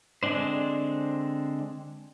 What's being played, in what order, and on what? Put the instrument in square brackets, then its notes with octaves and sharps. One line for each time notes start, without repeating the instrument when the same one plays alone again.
[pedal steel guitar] D3 G#3 C4 D4 C5